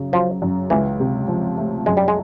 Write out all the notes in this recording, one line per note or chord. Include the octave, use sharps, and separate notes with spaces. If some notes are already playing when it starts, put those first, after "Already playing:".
Already playing: F#2 C#3
F3 F#3
F#2
C#2 E3
C3
F3
A3
F#2 G#3
G3
G#3